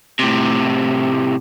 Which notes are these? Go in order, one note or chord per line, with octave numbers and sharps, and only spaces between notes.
A2 C3